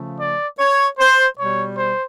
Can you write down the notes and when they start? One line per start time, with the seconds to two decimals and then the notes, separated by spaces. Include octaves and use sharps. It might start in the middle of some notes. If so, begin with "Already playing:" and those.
Already playing: C#3 F3 A3
0.19 D5
0.59 C#5
0.99 C5
1.38 B2 G3 C#5
1.77 C5